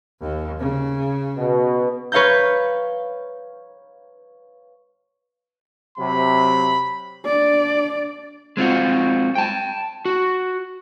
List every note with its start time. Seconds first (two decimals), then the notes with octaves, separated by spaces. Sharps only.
0.21 D#2
0.60 C#3
1.37 B2
2.12 B4 C#5 F5 A#5 G6
5.98 C3 F#3 B5
7.26 D4 D5
8.57 G#3 C4 F4 F#4
9.35 G5 A5
10.05 F#4